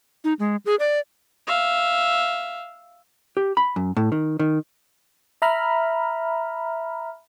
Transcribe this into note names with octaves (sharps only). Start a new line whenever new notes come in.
D#4
G#3
G#4
D5
E5 F5
G4
B5
F#2
A2
D#3
D#3
E5 A#5 B5 F6